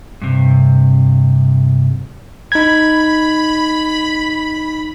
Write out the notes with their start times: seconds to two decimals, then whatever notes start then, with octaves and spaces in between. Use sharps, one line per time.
0.22 G2 C3
2.52 D#4 B5 G#6